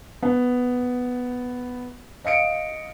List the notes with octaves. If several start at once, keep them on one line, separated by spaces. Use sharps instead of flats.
B3
D#5 F5 C#7 D7